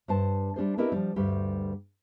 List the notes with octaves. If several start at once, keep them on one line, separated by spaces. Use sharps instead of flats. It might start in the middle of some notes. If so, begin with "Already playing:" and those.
G2 C5 A5
G3 D4 G#4 C5
B3 C4 E4 G4 A#4 D#5
F3 G3
D2 G2 G3 G4